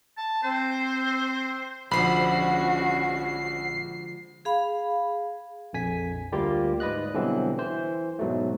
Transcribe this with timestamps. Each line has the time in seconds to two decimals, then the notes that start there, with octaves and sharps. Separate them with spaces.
0.17 A5
0.43 C4 C5
1.91 A#1 D3 F3 G#3 C#4 F#4 B5 C7
4.45 G#4 F5 B5
5.73 A#1 F2 G#5 B6
6.32 D2 G3 A#3 F4 G4
6.80 G#2 B4 D5 D#5 F#6
7.14 B2 D3 E3 F#3 G3 C4
7.58 E3 C5
8.19 G#2 B2 F#3 A3